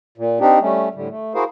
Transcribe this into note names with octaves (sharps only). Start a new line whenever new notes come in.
A#2
C4 D4 D#4 G4
G3 A3 C#4
A2 D3 G3
A3
E4 F#4 G#4 A#4 C5 F5